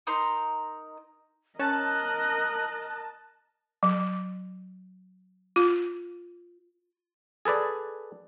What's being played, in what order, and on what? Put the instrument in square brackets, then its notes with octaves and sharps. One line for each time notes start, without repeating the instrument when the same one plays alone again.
[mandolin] D#4 A#4 A#5 C6
[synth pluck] C#4 [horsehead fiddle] A#4 D#5 [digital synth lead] A5 [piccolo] F#6
[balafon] F#3
F4
[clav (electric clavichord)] G#4 A4 B4 D5